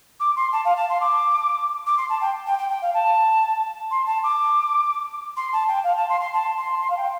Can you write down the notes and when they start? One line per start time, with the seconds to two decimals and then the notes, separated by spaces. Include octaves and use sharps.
0.20 D6
0.36 C6
0.52 A5
0.65 F5
0.76 A5
0.89 C6
1.00 D6
1.86 D6
1.97 C6
2.09 A5
2.21 G5
2.46 G5
2.58 G5
2.69 G5
2.82 F5
2.94 A5
3.91 C6
4.06 A5
4.23 D6
5.36 C6
5.52 A5
5.68 G5
5.84 F5
5.96 A5
6.09 C6
6.20 C6
6.33 A5
6.57 C6
6.81 C6
6.90 F5
6.97 G5